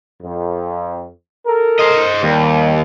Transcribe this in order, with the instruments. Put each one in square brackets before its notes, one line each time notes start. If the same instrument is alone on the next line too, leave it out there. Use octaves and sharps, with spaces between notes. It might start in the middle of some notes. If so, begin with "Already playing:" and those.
[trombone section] F2
A4 A#4
[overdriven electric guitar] C5 D#5
[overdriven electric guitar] D#2 [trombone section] D#3 G3